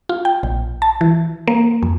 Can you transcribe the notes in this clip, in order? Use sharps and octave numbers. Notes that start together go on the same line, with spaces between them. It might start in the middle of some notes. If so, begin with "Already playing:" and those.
F4
G5
A#1
A5
E3
A#3
F2